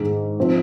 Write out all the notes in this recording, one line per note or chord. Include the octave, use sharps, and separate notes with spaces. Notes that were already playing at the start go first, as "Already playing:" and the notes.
Already playing: G#2 D#3 G#3
F3 C4